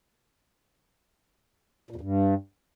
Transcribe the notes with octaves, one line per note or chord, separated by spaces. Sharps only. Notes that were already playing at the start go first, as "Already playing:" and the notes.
A#2
E2
G2